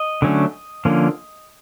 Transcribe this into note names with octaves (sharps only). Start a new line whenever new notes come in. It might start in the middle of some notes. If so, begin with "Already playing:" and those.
Already playing: D#5
D3 F#3 A3 C#4
D3 F3 A#3 C#4